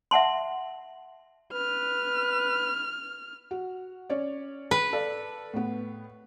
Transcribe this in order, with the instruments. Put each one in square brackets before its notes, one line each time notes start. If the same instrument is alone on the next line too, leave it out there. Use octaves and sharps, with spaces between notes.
[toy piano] E5 F#5 A5 C6
[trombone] B4 [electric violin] F6
[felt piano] F#4
C#4 C#5 D5
[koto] B4
[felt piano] A4 D5 F5
A2 B3